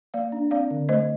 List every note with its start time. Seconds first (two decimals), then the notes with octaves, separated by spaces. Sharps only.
0.14 A#3 D5 F5
0.32 D4
0.51 C4 D5 F5
0.71 D3
0.89 A3 C5 D#5